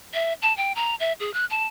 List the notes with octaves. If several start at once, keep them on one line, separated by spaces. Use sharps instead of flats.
E5
A5
G5
A#5
E5
G#4
F#6
A5